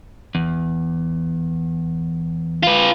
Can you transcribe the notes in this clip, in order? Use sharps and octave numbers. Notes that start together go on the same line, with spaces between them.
E2
F4 B4